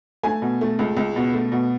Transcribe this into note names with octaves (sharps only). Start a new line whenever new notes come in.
A3 G#5
B2
A3
C#2
C#2
B2
A3
B2